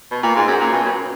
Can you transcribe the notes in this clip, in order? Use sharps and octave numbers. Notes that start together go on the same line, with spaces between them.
B2
A#2
G#2
F#2
A#2
B2
F#2